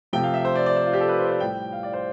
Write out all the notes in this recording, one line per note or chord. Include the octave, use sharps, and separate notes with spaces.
C3 F3 A3 G5
F5
E5
C5
D5
D5
C5
F4
G4
A4
B4
C5
D5
C5
A2 G3 G5
F5
D5
C5